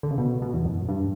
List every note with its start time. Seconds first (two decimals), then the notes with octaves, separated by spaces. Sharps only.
0.03 D3
0.11 C#3
0.18 B2
0.42 B2
0.54 E2
0.65 F#2
0.89 G2